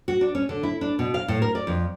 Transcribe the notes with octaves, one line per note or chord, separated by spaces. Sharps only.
F#4
D4
C#4
D3
E4
D4
B2
F5
A2
A#4
D5
F2